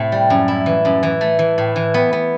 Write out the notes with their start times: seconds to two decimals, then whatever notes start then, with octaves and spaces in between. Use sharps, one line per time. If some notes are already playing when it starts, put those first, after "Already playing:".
Already playing: A2 C3 A3
0.12 G3
0.30 F#2
0.48 E4
0.66 E3
0.85 F#2
1.03 E3
1.21 A3
1.39 E3
1.58 A2
1.76 E3
1.94 B3
2.13 B3